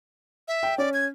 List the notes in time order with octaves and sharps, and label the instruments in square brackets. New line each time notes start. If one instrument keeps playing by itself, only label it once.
[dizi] E5
[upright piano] G5
[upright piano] C#4 [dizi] D5
[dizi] G#6